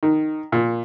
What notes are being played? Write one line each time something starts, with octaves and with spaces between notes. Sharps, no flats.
D#3
A#2